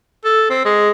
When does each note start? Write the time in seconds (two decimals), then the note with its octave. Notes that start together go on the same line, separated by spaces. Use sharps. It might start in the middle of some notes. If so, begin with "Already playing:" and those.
0.24 A4
0.50 C4
0.65 G#3